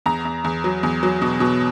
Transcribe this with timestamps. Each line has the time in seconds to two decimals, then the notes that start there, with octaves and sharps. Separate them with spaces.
0.06 E2 A#5
0.25 E2
0.44 E2
0.64 F#3
0.83 E2
1.03 F#3
1.22 B2
1.40 B2